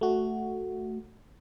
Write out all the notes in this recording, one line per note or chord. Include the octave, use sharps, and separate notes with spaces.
A3 F#4